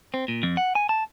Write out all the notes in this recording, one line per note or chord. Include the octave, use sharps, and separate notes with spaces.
C4
A#2
F2
F#5
G#5
A5